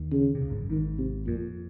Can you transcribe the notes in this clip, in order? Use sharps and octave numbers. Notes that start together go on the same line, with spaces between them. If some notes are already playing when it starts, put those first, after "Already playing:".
Already playing: D#2 D#3
C#3
C3
C#2 C#3
G#1 G#2
F#2
G#1 G#2 D#3
C3
F2 A#2